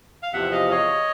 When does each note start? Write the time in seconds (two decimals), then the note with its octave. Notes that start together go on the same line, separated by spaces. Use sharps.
0.23 F5
0.33 E2 C3 F3 E5 F#5
0.52 D#5 F5
0.71 C#5 D#5